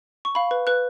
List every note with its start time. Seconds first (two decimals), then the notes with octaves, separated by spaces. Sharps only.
0.25 C#6
0.35 F5 B5
0.51 B4
0.67 B4 F#6